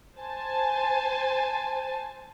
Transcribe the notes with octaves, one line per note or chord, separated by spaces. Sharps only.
C5 G#5 A5